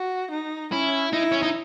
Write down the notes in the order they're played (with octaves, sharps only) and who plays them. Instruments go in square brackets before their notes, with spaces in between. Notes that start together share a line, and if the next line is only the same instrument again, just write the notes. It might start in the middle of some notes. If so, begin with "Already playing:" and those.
Already playing: [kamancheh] F#4
D#4
[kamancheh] C#4 [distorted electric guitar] E4
[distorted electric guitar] D#4 [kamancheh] E4
[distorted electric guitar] C#4
D#4